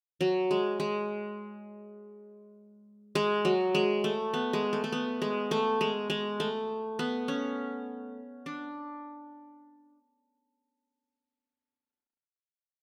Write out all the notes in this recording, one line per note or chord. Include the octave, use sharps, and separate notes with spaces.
F#3
G#3
G#3
G#3
F#3
G#3
A3
B3
G#3
A3
A3
B3
G#3
A3
G#3
G#3
A3
B3
C#4
D4